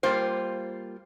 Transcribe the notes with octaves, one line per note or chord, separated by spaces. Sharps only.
G3 A#3 F4 C5